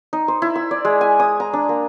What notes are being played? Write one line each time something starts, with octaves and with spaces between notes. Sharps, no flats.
D#4
C5
E4
E6
D5
G#3
G#5
D#6
A#5
D4
A#3